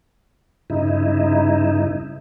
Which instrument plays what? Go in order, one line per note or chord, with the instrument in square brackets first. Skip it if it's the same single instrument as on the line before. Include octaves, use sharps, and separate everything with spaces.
[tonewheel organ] G2 C#3 D#4 E4